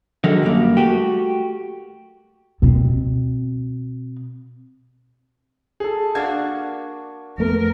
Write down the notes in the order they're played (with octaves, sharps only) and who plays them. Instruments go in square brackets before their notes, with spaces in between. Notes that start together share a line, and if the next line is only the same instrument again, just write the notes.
[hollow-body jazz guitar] D3 D#3 F#3 G#3 A4 A#4
F#2 G3 A#3
A3 F#4 G4
[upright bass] B2 C4
[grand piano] G#4 A4
[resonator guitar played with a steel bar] A#3 D4 F#4 [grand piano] G#6
[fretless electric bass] F2 A3 B3 [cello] A#4